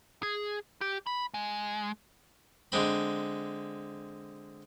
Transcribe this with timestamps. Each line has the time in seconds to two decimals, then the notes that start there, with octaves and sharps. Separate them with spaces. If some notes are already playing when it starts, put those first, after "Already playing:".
0.23 G#4
0.81 G4
1.07 B5
1.34 G#3
2.72 D3 G#3 C4 B5